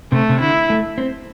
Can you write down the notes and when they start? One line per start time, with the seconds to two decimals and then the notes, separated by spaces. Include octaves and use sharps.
0.12 C3 A3
0.29 C3
0.40 D3 E4
0.70 A3
0.98 C4